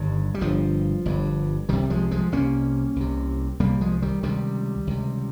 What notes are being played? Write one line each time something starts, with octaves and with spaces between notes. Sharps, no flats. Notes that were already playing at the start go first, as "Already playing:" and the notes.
Already playing: G1 G2 D#3 G3
G3
G1 G2 F3
G1 G2
C2 C3 D#3 G3
F3 G#3
F3 G#3
C2 C3 A#3 C#4
C2 C3
C2 C3 G3 A#3
F3 G#3
D#3 G3
C#2 C3 D#3 G3
C#2 C3